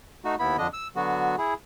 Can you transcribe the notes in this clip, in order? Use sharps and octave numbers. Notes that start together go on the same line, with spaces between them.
A3 D#4 F#4
D#2 B3 E4 B5
F2 D3 D4 D#5
E6
D3 F#3 B3 F#4
E4 G#4